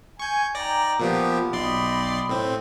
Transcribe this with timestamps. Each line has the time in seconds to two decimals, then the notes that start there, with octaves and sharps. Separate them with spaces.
0.19 G#5 C#6 G6
0.55 D#4 D5 G5 A#5 A#6
0.99 A#2 F3 B3 G4
1.53 B1 D5 D#5 G5 B5 C6
2.29 A2 C4